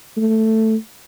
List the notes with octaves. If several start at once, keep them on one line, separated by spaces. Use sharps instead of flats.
A3